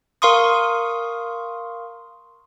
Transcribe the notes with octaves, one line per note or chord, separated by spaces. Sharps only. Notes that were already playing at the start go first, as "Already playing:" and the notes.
A#4 F5 C6 C#6 D#6